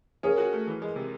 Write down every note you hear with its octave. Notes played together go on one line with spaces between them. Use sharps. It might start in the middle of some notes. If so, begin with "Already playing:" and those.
C#4 G#4 A#4
F#4
A3
E3
G#3
C3